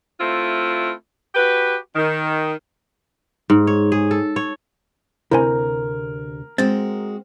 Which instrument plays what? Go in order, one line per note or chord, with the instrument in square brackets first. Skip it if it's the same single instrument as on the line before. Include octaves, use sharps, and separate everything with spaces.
[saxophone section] A3 C4 E4 F4
F#4 G4 B4
D#3
[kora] G#2
C#5
G#4
A4
C#5
[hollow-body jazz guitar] D2 C3 [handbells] E4 C5 G#5 [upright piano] A#4
[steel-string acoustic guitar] G#3 F#4 [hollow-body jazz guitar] C4 [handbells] A6